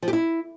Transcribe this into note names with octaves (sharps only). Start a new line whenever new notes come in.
F3
G4
E4